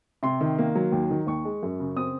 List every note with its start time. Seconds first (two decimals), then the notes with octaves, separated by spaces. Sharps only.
0.23 C3 C6
0.41 D#3
0.58 A#3
0.75 F#3
0.92 D#2
1.11 D#3
1.27 D#2 C#6
1.45 G#3
1.63 F#2
1.80 C#3
1.96 C4 D#6